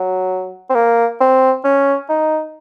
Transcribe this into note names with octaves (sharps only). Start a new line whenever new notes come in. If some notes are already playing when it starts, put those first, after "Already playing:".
Already playing: F#3
C4
A#3
C4
C#4
D#4